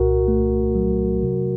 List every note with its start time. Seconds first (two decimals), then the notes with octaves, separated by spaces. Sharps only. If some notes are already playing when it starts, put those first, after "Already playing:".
Already playing: C2 A#2 F#4 A#4
0.28 A3
0.75 F#3
1.22 C3